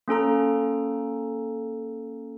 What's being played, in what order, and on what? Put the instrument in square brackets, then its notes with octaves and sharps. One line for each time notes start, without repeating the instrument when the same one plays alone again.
[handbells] A#3 C#4 A4 A#5